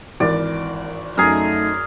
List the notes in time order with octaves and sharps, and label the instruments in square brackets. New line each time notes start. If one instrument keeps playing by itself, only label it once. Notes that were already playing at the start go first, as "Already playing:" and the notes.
[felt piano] G#1 E3 A#4 [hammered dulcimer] D5
[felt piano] F#2 [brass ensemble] A3 D#4 [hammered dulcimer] G#4 A#4